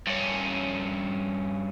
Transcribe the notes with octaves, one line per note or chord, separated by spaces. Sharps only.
G2 C#4